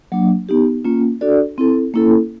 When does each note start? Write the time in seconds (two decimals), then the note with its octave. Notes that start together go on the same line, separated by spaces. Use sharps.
0.12 F#3 A#3 D4
0.49 B3 D#4 G4
0.85 A#3 C#4 F4
1.21 D4 F#4 A4 D5
1.58 C4 E4 A4
1.94 A#3 C#4 E4 A4